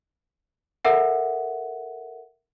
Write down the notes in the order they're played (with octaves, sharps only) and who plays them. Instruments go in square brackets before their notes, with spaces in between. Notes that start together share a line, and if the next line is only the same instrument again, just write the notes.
[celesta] A4 A#4 E5 F#5